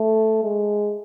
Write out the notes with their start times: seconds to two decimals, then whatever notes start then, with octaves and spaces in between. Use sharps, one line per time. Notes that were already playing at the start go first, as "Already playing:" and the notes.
Already playing: A3
0.43 G#3